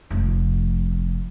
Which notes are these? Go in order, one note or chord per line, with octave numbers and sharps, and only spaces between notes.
F1 F3